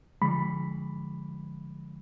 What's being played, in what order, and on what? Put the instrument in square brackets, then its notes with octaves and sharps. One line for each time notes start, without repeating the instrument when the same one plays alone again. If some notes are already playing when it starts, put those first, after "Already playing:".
[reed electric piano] D3 F3 G#3 B5